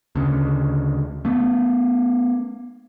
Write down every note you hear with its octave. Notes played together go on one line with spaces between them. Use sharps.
D2 C#3
A3 B3